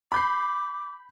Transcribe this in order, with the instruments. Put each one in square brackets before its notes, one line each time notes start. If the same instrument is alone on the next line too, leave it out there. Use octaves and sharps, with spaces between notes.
[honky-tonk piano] B5 G6 C7 [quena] D6